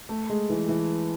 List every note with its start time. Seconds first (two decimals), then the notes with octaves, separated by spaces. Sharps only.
0.09 A3
0.30 G#3
0.50 E3
0.68 E3